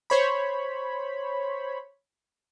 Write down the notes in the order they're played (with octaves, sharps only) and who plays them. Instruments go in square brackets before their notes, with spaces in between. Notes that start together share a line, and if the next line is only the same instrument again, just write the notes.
[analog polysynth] C5 C#5 B5